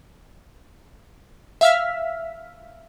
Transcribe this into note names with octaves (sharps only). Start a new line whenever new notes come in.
E5 F5 E6 F6 B6